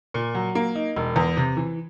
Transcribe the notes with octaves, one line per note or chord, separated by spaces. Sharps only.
A#2
F#3
A#3
D#4
E1
E2
C3
E3